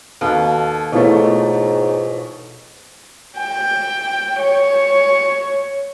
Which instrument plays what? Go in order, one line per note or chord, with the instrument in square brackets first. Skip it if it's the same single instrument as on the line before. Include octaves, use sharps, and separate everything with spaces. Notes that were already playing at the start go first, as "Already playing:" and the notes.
[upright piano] D#2 [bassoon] B2 [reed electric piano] A4 A5
[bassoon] G#2 [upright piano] B2 E3 A3 [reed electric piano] D#4 F4 C#5
[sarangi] G5
C#5